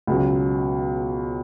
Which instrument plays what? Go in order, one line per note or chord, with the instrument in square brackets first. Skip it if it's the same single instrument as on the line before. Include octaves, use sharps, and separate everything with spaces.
[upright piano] C#2 B2 F#3 C#4